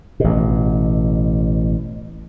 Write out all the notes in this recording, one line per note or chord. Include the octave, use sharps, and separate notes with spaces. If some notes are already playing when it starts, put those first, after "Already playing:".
A1 B2